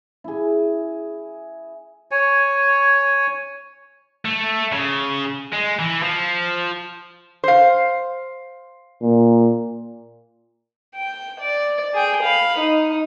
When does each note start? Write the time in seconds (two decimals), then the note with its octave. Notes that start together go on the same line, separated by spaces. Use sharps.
0.24 E4 G#4
2.11 C#5 G#5
4.25 A3
4.72 C#3
5.53 G#3
5.79 E3
6.03 F3
7.44 C5 F5
9.02 A#2
10.95 G5
11.40 D5
11.94 G#4 G5
12.23 F5 B5
12.59 D#4